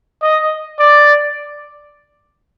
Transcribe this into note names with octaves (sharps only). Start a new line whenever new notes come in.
D#5
D5